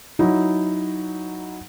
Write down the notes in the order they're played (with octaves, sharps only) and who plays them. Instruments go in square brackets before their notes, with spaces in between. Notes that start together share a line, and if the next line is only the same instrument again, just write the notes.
[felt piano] F#3 D#4 E4